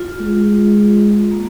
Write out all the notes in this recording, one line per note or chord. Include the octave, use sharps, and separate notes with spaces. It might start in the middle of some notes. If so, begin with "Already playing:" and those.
Already playing: F4
G#3
A#3